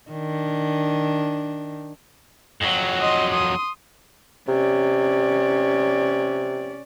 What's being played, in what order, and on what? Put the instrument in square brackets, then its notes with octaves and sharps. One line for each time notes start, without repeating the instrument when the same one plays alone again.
[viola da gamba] D#3 D4
[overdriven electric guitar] F2 F#3
[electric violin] D#5 C6
C6 D#6
[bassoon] C3 [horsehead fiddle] C#4 D5